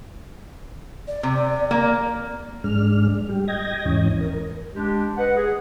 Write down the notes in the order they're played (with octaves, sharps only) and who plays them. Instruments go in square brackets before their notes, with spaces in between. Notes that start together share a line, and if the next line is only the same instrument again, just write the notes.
[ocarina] D5
[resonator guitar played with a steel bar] C3
A#3
[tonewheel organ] G#2 G#3 D4 F6
G3 G4
D#5 G5 G#6 A#6
E2 G#2 E3 C#4 D#5
A#4
[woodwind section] G#3 D4 G4
B4 D#5 F#5
G#4